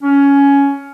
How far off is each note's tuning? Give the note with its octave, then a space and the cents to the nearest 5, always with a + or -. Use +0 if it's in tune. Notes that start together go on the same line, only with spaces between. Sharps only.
C#4 +15